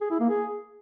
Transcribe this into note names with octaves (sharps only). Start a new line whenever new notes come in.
G#4
E4
A#3
G#4